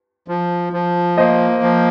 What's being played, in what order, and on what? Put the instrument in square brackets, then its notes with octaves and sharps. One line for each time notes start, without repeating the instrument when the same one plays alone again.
[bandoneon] F3
F3
[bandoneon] A#3 [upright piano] C5 D#5
[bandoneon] F3